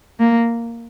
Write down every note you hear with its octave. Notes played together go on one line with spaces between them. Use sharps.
A#3